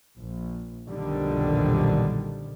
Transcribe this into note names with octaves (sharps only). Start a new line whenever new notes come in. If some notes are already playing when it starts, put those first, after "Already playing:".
A#1
B1 F2 A#2 D3 D#3 G3